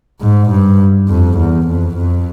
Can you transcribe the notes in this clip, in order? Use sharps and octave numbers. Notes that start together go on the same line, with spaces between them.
G#2
G2
F2
E2
F2
F2